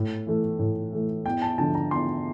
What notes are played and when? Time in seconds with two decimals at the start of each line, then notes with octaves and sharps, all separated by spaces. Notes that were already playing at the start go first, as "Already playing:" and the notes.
Already playing: A2
0.27 E3 A3
0.59 A2
0.92 E3 A3
1.25 E2 G5
1.42 A5
1.58 D3 F3 A5
1.75 A#5
1.91 E2 C6